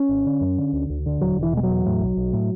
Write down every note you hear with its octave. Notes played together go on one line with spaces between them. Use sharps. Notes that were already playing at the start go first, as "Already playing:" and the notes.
Already playing: C#4
G#1
D3
F#2
D3
D2
D2
D3
E1 F#3
E1
E3
B2 G#3
F#3
E2
A2
B1
B1
A2